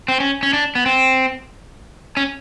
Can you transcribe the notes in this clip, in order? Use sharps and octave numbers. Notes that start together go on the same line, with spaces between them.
C4
C#4
C#4
D4
B3
C4
C#4